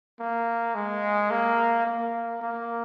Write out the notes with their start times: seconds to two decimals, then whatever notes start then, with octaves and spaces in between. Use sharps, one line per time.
0.20 A#3
0.75 G#3
1.31 A#3
1.86 A#3
2.41 A#3